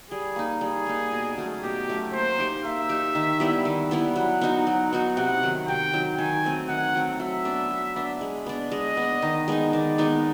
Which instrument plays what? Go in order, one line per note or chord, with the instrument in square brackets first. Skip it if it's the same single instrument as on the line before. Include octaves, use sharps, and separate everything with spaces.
[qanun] G3 [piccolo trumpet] G#4
[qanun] A#3 D#4
[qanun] G3 [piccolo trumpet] G#4
[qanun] A#3 D#4
B2
F#3 A3 C#4
[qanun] B2 [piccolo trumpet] G4
[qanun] F#3 A3 C#4
[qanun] A#3 [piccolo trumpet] C5
[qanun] D#4 G4
[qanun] A#3 [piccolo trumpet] E5
[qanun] D#4 G4
D#3
G3 B3 E4
D#3
G3 B3 E4
[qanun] F#3 [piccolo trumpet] F#5
[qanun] B3 D#4 F#4
[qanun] F#3 [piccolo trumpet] F#5
[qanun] B3 D#4 F#4
[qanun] C3 [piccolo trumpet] F#5
[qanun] D#3 F#3
[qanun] C3 [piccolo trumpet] G5
[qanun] D#3 F#3
[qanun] D#3 [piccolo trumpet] G#5
[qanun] F#3 A3 C4
[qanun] D#3 [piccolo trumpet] F#5
[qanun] F#3 A3 C4
[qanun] F#3 [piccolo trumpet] E5
[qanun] B3 D4
F#3
B3 D4
G#3
B3 D4
[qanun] G#3 [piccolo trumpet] D#5
[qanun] B3 D4
D#3
G#3 B3 D#4
[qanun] D#3 [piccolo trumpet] D5
[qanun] G#3 B3 D#4